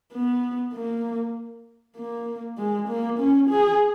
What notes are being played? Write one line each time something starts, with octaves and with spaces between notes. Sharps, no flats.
B3
A#3
A#3
G#3
A#3
C#4
G#4